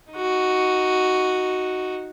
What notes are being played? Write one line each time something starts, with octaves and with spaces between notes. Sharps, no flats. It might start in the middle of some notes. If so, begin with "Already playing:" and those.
D#4 F#4